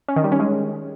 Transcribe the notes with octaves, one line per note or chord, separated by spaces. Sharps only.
C#4
D#3
G3
C#4
G#3